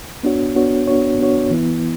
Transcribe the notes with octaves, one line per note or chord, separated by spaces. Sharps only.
B3 D4 F#4 C#5
B3 D4 F#4 C#5
B3 D4 F#4 C#5
B3 D4 F#4 C#5
E3 B3 E4